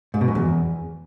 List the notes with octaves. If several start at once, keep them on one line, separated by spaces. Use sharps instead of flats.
G#2
B2
F#2
E2